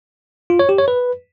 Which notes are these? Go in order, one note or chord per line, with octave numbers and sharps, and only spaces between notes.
F4
C#5
G4
C#5
B4